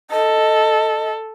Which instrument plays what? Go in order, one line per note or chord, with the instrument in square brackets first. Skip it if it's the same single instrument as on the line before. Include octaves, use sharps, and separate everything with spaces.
[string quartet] A4 [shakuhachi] D#5